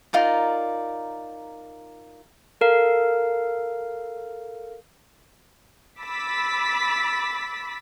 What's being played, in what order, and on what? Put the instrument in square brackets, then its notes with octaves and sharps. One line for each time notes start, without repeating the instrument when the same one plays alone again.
[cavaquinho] D#4 F4 A#4 D5
[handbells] A4 A#4 F5
[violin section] B5 D6 E6 A6 B6